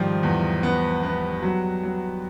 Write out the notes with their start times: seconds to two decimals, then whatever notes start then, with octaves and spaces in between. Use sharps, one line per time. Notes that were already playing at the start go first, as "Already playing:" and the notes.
Already playing: G#2 D#3 F3 G3
0.23 E2
0.63 B3
1.03 B3
1.42 F#3
1.83 F#3